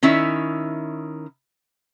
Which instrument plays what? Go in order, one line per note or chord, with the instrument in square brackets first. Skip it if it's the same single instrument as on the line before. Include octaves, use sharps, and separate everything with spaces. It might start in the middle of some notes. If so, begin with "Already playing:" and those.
[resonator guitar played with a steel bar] D#3 C#4 E4 E5